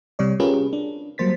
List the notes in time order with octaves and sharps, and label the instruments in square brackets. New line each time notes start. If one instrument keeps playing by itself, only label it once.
[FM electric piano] C3 G3 C#5 D5
C#4 F4 G4 G#4 A#4 B4
D4
F#3 G3 A#3 C5 A6 B6